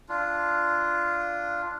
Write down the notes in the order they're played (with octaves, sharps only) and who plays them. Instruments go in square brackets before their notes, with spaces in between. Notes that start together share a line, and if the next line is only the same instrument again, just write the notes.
[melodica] D4 F4